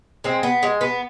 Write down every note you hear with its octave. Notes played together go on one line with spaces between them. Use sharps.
G#3 C4
B3
G#3
B3